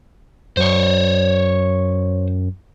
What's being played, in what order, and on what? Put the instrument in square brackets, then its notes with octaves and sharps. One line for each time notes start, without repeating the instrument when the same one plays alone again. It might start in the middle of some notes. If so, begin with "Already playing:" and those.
[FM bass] F#2 [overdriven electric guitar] C5 C#5